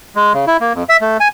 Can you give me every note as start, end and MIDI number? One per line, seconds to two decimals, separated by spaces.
0.16 0.33 56
0.34 0.45 49
0.47 0.57 64
0.61 0.73 58
0.74 0.83 41
0.89 0.97 76
1.01 1.17 57
1.20 1.28 80